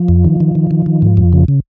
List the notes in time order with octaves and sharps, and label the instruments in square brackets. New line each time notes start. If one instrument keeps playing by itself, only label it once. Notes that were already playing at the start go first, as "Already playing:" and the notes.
Already playing: [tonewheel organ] F3
F2
D#3
D#3
D#3
D#3
D#3
G#2
F2
C#3
C#3